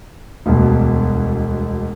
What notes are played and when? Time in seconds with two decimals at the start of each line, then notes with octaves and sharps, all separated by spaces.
0.46 E1 D2 G2 B2